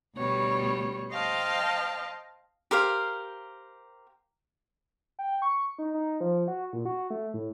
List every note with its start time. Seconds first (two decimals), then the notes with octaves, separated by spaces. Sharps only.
0.15 D2 B2 G3 C#5
1.11 C5 D#5 F5 G5 A5
2.71 G4 A#4 C5 F5
5.19 G5
5.42 C#6
5.79 D#4
5.94 D#4
6.21 F3
6.48 F#4
6.73 A#2
6.85 F#4
7.10 A3
7.34 A2